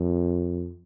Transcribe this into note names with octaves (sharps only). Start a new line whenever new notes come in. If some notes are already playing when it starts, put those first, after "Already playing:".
Already playing: F2